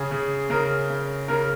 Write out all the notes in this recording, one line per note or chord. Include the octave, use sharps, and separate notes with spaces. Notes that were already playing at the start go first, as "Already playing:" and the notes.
Already playing: C#3 G#4
C#3
C#3 A#4
C#3
C#3 A#4